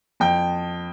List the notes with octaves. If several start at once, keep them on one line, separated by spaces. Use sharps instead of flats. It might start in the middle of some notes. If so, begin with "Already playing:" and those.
F2 G5